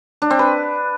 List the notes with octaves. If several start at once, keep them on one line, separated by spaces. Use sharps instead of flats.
D4
C4
B4